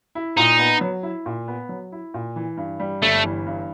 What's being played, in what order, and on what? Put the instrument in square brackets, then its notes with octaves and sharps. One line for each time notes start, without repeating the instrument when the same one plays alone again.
[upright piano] E4
[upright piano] A#2 [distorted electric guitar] D#4
[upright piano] B3
F#3
E4
A#2
B3
F#3
E4
A#2
E3
G2
G3
[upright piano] G1 [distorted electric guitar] A3
[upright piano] E3
G2